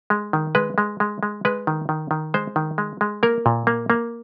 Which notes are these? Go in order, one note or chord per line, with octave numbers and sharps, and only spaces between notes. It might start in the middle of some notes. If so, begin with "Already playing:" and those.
G#3
D#3
G#3 B4
G#3
G#3
G#3
G#3 B4
D#3
D#3
D#3
G#3 C5
D#3
G#3
G#3
A#3 A#4
A#2
A#3
A#3